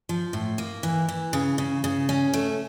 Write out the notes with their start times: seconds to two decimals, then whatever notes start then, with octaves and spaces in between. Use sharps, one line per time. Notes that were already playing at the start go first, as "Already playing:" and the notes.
0.09 F3
0.33 A2
0.58 A#3
0.83 E3
1.08 E3
1.33 C#3
1.58 C#3
1.84 C#3
2.09 C#4
2.34 A3